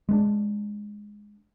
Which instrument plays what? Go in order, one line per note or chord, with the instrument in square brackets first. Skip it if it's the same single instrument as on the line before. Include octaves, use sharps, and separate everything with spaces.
[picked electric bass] G#3 B3 D4